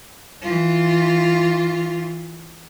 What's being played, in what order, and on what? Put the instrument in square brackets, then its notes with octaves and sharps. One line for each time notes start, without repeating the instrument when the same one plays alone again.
[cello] E3 F4